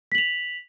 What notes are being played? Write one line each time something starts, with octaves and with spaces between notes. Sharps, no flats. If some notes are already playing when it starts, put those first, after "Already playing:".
B6 F7 F#7